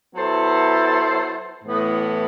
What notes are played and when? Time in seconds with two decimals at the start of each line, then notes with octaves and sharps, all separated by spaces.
0.14 F#3 B3 E4 A4 C5
1.64 A2 E3 B3